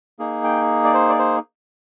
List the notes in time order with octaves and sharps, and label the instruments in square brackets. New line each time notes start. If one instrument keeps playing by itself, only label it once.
[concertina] A#3 D#4 G#4
G5
D5
C5
D5
C5